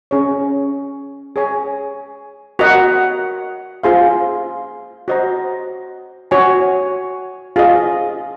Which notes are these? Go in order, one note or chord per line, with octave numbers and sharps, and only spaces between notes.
C#4 G#4 C#5
G#4 C#5 G#5
F#4 A#4 D#5 F#5
F4 G#4 C5 F5 C6
F#4 C5 D#5 A#5
F#4 C#5 G#5
F4 G#4 D#5